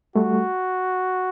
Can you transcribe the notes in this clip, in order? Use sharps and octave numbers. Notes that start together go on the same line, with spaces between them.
G3 A3 F#4